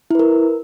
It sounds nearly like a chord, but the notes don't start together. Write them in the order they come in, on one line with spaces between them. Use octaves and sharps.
E4 B4 A#4